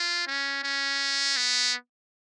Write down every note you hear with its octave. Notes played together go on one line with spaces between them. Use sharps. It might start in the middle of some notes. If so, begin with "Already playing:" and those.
Already playing: F4
C#4
C#4
B3